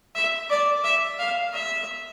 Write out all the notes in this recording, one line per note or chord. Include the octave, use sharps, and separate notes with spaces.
E5
D5
E5
F5
E5